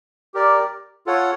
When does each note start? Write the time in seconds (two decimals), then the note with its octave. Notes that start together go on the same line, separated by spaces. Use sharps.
0.34 G4 A#4 D5
1.06 F4 A4 C#5 F#5